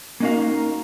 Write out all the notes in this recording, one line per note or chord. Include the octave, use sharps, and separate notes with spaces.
A#3 C#4 D#4 F#4 A#4 F5